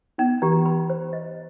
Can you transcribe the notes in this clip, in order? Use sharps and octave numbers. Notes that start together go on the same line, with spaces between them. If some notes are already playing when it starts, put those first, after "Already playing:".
B3 D#4
E3 G4
B5
C5
D#5